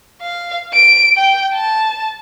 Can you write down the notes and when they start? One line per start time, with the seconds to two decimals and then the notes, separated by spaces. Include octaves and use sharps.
0.21 F5
0.73 D7
1.17 G5
1.54 A5